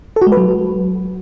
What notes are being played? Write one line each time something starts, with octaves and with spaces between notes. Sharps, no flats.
A4
F#4
G#3
B4
F#3